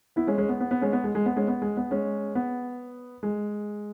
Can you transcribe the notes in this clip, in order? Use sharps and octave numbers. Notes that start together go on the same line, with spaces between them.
B3 E4
G#3 C#4
G#3 C#4
B3
B3
B3
G#3 C#4
B3
G#3
G#3
B3
G#3 C#4
B3
G#3
B3
G#3 C#4
B3
G#3